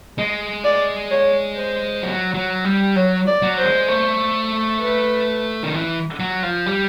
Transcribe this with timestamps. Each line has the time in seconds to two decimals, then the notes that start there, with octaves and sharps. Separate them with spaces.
0.18 G#3 D#5
0.64 D5
1.11 C#5
1.56 C5
2.03 F#3
2.34 F#3
2.65 G3
2.96 F#3 C#5
3.27 D5
3.42 F#3
3.58 C5
3.65 G#3
3.88 A3
4.81 B4
5.64 D#3
5.74 E3
6.20 F#3
6.43 F3
6.66 G3